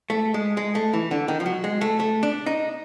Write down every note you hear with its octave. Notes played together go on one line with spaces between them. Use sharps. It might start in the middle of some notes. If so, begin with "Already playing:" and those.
A3
G#3
G#3
A3
E3
D3
D#3
F3
F#3
G#3
A3
A3
D4
D#4